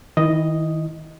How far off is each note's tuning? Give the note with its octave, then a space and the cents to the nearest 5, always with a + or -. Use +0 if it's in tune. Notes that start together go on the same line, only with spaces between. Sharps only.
D#3 +30 E4 +0 D#5 +0